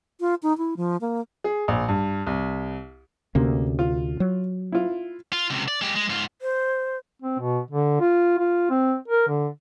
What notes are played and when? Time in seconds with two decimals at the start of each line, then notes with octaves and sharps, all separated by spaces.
0.20 F4
0.43 D#4
0.58 E4
0.77 F3
1.01 A#3
1.44 G#4
1.68 A#1
1.88 G2
2.27 C2
3.35 D2 C3 A#3 C#4
3.79 F4
4.20 F#3
4.72 E4 F4
5.33 F4
5.50 C#2 C3
5.68 D5
5.81 G#3 G4
5.96 G#3
6.10 G#2 F4
6.42 C5
7.22 C4
7.39 B2
7.71 D3
8.00 F4
8.39 F4
8.70 C4
9.08 A#4
9.28 D3